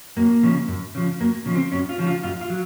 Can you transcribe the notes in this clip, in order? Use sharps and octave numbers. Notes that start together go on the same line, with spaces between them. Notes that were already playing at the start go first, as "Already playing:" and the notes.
F#2 A#3
C#3 F3
F#2
C#3 F3
F#2 A#3
C#3 F3
C4
F#2 C#4
F4
C#3 F3
F4
F#2 F4
F4
F#3